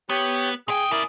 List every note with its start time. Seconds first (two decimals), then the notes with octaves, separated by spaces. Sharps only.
0.10 B3 G4 C#5
0.68 A#2 G#4 G5 D#6
0.91 C#3 E4 A#4 D5